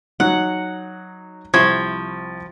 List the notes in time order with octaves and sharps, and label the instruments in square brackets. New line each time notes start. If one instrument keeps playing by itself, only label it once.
[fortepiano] F#3 D#4 [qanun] F#5
[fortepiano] C2 E4 C#6 [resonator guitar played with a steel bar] F3 [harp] G#6